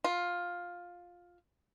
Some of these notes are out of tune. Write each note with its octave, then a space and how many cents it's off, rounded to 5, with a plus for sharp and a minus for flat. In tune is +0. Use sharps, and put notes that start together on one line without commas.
F4 +10